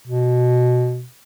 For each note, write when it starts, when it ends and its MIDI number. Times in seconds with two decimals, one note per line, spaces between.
0.08 1.05 47